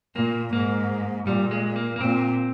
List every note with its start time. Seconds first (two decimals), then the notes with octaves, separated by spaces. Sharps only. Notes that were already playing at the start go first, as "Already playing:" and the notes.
0.16 A#2 A#3
0.53 G#2 A#3
1.27 A#2 G3
1.51 G#3
1.76 A#3
1.96 A#3
2.00 A#2 C4